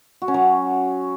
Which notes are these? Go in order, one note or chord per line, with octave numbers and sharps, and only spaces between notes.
F#4
C#4
F#3